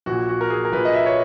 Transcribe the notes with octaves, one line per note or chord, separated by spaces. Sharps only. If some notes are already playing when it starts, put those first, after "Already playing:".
A#1 A#2 F#4
F#4
A#4
G#4
A#4
A#1 A#2 B4
D#5
E5
C#5